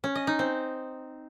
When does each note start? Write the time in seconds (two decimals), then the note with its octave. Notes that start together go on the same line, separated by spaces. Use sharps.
0.04 C#4
0.15 D#5
0.27 D#4
0.39 C4